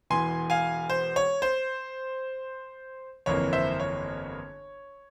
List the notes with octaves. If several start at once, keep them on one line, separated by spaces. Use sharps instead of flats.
E1 E2 E3 G#5 C6
F5 G#5
C5
C#5
C5
G1 F2 E3 A#3 C#5
C5 E5
C#5